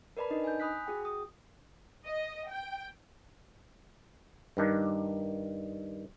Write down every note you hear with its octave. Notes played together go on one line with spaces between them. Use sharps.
A#4 B4 D5 A5 B5
D4 D#4 D#5
G#5 G6
G#5 B5 D#6 F#6 B6
F#4 G#4 G5
D#6
D#5
G5
G2 D#3 D4